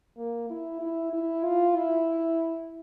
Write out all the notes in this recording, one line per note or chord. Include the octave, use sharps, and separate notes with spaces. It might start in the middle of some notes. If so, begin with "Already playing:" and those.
A#3
E4
E4
E4
F4
E4